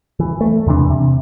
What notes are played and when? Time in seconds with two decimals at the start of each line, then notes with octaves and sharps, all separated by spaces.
0.20 E3
0.41 A3
0.67 E2 C3 E3 D4
0.90 C3